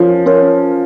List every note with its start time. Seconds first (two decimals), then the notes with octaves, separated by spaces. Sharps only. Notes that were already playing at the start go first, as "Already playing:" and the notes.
Already playing: F3 C#4 F4 A#4 C#5
0.26 C#4 F4 A#4 C#5